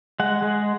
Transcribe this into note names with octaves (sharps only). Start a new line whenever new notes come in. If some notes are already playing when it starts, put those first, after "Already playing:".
G#3 F#5
G#3